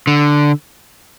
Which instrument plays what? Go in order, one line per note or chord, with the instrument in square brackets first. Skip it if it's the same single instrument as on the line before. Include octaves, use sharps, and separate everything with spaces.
[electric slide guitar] D3